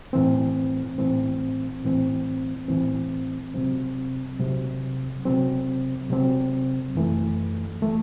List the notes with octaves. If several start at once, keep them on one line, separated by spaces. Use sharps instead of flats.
A2 E3 C4
A2 E3 C4
A2 E3 C4
A2 E3 C4
C3 F#3 C4
C3 F#3 C4
C3 F#3 C4
C3 F#3 C4
F#2 E3 A3
E3 A3